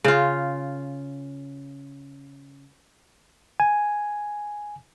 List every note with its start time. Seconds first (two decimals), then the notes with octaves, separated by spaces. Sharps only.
0.04 C#3 F4
3.60 G#5